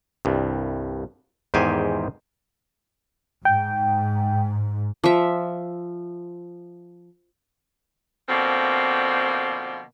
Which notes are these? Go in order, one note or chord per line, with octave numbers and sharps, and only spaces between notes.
C2 G2
E2 G#2 D#3 G4 C5 G#5
G#2 G5
F3 E5
B2 D3 F3 A#3 C4